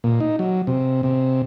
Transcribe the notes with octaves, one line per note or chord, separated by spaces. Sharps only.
A#2
D#4
F#3
C3
C3